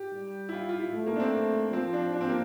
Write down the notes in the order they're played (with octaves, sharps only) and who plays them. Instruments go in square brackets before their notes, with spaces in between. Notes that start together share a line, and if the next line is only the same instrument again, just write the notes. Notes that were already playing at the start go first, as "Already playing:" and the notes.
Already playing: [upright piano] G4
[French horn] G3
[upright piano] E4
F4
F4
E4
[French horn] A3
[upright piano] A#3
D4
C4
[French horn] F3 [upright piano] C4
[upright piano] D4
D4
C4
A#3